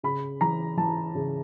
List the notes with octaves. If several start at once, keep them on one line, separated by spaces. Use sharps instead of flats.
C#3 B5
E3 A#5
E3 A5
C#3